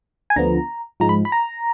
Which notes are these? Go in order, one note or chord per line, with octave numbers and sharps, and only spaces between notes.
G#5
D2 D3 F3 B3 A#5
G#2 F3 G#3 A#5
B5
B5
A#5